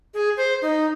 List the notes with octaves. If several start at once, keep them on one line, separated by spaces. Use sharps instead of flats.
G#4
C5
D#4